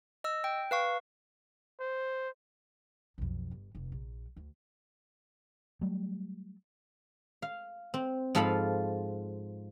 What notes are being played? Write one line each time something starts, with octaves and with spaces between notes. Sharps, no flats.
D#5 E6
G5
B4 F5 C#6
C5
B1 F2
G1
F1
A#1
D2
F#3 G3 A3
F5
C4
G#2 F3 F4 A4 F5 B5